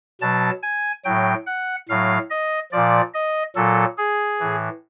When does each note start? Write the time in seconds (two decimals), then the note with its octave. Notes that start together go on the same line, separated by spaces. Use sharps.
0.21 B2 F#3 A5
0.63 G#5
1.05 A2 F#3 G5
1.47 F#5
1.89 A2 F#3 F5
2.30 D#5
2.72 A#2 F3 D5
3.14 D#5
3.55 A#2 F#3 A4
3.98 G#4
4.40 A2 E3